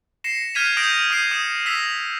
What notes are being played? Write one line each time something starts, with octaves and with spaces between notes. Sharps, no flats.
A#6 C7 C#7 E7
F6 G6 G#6 B6 D#7 F7
D#6 G6 A#6 D7 F7
D#6 G6 C7 D7 D#7
D#6 C#7 E7
E6 A#6 B6 F7